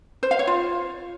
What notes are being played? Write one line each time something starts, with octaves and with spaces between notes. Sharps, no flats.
C5
F5
C#5
F4